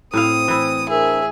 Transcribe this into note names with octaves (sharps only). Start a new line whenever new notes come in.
A2 C4 E4 F5 D#6
E3 E4
C4 D4 G#4 A#4 E5